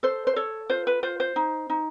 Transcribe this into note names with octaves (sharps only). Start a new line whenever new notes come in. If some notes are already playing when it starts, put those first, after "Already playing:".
A4 C5
C5
A4 C#5
F4 C5
B4
F4 C5
C5
D#4
D#4